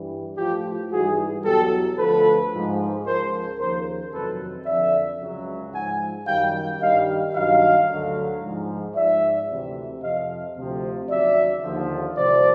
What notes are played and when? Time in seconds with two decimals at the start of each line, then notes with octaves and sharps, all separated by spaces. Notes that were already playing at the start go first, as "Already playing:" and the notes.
Already playing: G2 E3 G3
0.37 A2 F3 F4 G4
0.91 G#2 E3 G3 F#4 G#4
1.44 E2 B2 F#3 G4 A4
1.98 D2 D3 F3 A4 B4
2.52 G#2 F3
3.05 C#2 C#3 F3 A#4 C5
3.58 D#2 C#3 F3 A#4 C5
4.12 F2 C3 D#3 F#3 A4 B4
4.66 F2 D3 F3 D5 E5
5.20 C#2 C#3 F#3
5.73 G#2 F3 F#5 G#5
6.26 F#2 D#3 G3 F5 G5
6.80 G2 D#3 G3 D#5 F5
7.34 G2 D#3 F#3 D#5 F5
7.88 D2 D3 F#3
8.41 G#2 F3
8.95 G#2 F3 D5 E5
9.49 D2 C3 E3
10.01 F2 C3 F3 D#5 F5
10.55 D2 C3 F3
11.09 D#2 C#3 F#3 D5 E5
11.62 D#2 D3 F3
12.16 C2 C3 F3 C5 D5